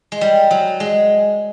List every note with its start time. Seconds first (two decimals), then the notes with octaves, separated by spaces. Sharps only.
0.12 G#3
0.21 G3
0.51 F#3
0.80 G#3